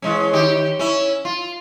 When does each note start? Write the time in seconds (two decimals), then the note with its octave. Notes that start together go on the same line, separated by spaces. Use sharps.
0.02 E3 G#3 C#4
0.33 D#3 G4
0.79 C#4 E4
1.25 F4